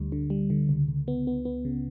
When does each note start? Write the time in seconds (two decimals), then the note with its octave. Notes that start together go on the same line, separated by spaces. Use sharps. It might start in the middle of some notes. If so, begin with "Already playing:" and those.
Already playing: D2 D3 G3
0.12 D3
0.30 G3
0.50 D3
0.69 C#2
0.88 C#2
1.08 B3
1.27 B3
1.45 B3
1.65 C#3